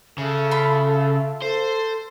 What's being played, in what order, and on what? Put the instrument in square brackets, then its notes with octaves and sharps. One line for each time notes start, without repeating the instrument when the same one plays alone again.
[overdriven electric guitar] C#3 [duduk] A4 [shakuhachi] E5
[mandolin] F4 B5
[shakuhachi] A4 [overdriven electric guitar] C5